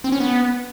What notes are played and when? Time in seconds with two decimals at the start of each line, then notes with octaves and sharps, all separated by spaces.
0.04 C4
0.12 C#4
0.20 B3